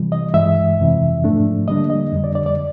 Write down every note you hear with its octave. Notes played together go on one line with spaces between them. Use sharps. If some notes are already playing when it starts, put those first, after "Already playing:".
Already playing: C3 E3 G3
D#5
G2 E3 G#3 E5
F2 C3 E3
G#2 F3 A3 D4
D3 G3 A#3 D4 D#5
D#5
F2 D3 G3
D5
D5
D5